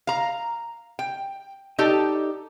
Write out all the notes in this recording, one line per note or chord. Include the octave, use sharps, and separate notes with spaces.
F5 A#5
G5
D#4 G4 A4 D5